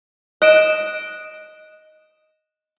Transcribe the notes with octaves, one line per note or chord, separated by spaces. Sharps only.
D#5 F#6 D7 E7